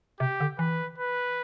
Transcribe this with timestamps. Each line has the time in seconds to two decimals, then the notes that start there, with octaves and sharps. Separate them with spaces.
0.20 C3 G4
0.40 D3
0.59 E3 B4
0.98 B4